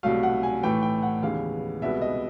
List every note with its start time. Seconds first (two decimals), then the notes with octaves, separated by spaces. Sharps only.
0.03 C2 B2 F#3 A3 F5
0.23 F#5
0.43 G#5
0.63 A2 E3 A3 G5
0.82 G5
1.03 F#5
1.22 D#2 C#3 E3 G#3 B3 F5
1.82 C2 B2 G#3 B3 E5
2.02 D#5